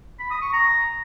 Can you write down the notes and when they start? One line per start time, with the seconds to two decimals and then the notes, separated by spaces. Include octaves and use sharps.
0.19 B5
0.31 D#6
0.42 C#6
0.53 A#5